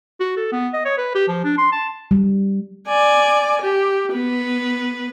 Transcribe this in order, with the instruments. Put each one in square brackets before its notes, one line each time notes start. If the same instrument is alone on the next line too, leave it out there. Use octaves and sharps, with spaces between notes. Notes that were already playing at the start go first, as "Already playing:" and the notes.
[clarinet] F#4
A4
B3
D#5
C#5
B4
G4
F3
D4
C6
A5
[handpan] G3
[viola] D5 G#5
G4
B3 B4